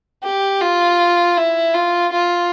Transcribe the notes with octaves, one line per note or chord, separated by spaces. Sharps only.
G4
F4
E4
F4
F4